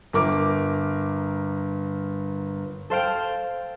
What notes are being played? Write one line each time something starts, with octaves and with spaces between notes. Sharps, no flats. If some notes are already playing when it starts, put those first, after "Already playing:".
G1 A#4 D6
A4 C5 F5 G5